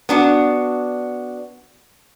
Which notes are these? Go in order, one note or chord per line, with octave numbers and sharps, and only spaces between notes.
B3 D4 F#4